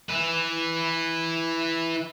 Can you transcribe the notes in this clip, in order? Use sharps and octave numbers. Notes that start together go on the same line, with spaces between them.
E4 B4